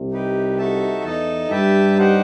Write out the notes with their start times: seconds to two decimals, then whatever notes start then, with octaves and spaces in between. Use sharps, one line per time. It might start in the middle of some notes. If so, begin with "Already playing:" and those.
Already playing: C2 C3
0.12 D#4 G4 B4
0.58 D#4 F#4 A4 E5 A5
1.04 E2 E3 D#4 A4 D#5 A5
1.50 G2 G3 G4 B4 E5 A5
1.97 D#4 G4 C5 F#5